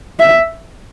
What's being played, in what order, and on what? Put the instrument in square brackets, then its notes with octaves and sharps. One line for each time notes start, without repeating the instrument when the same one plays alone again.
[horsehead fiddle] E5